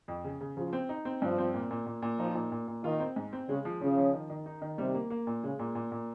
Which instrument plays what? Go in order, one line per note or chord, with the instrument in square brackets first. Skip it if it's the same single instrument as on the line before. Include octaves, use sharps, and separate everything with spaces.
[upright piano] F2
C#3
C#3
[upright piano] C#3 [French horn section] F3
[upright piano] C4
D#4
C4
[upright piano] G2 [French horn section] F3
[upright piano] C4
A#2
A#2
A#2
A#2
[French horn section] F3 [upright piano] D#4
[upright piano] A#2
A#2
A#2
[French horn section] D#3 [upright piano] F4
[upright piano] C4
G#2
C4
[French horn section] C#3 [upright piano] G#3
[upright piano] F3
[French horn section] C#3 [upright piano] F3
[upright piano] F3
D#3
D#3
D#4
D#3
[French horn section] C3 [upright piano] G3
[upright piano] A#3
A#3
A#2
[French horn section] C#3 [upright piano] G#3
[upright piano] A#2
A#2
A#2